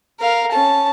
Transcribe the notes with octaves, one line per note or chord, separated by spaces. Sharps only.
A#4 F5
C#4 A5